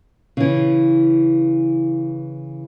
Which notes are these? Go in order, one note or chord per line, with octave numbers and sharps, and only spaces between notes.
C#3 E3